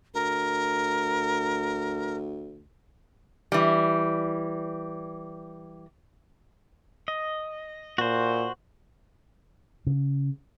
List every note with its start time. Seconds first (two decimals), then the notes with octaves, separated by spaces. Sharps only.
0.14 D2 A#4
3.52 E3 G3
7.08 D#5
7.98 A#2 F#4 C5
9.87 C#3